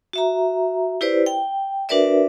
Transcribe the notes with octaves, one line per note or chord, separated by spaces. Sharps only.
F#4 E5 A#5
E4 G4 B4 C5 D5
G5
D4 F#4 A#4 B4 D5 E5